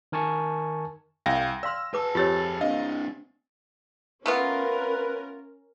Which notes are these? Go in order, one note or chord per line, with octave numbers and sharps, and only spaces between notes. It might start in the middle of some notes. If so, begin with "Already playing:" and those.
D#3 A#4 G#5 A5 C#6
C2 F5 G5 A#6
D5 F5 C6 E6 F6
G#4 B4 A5 D6
F2 F4 G4 C#5 A6
C4 D4 D#5 F5
A3 B3 C#4 F4 A#4 B4